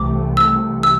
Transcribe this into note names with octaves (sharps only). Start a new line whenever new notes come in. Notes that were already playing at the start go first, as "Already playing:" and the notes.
Already playing: C2 C3 E3 A3 D6
E6
E6